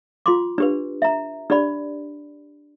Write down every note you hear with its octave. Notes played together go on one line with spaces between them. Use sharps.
F4 C6 D6
D4 G4 B4
E5 A#5
D4 G4 D5 B5